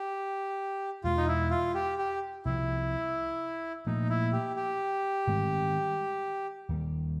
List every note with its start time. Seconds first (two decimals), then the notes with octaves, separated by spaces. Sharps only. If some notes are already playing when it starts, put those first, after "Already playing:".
Already playing: G4
1.04 E2 B2 G#3 F4
1.17 D#4
1.27 E4
1.51 F4
1.75 G4
1.98 G4
2.45 C2 C3 F3 E4
3.86 A#2 F3 A3 D#4
4.10 E4
4.33 G4
4.56 G4
5.27 G#2 D#3 G3 C4
6.69 D#2 D#3 G3